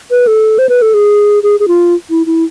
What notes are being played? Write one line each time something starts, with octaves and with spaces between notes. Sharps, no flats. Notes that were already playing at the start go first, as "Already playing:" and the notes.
B4
A4
C5
B4
A4
G#4
G#4
G#4
F4
E4
E4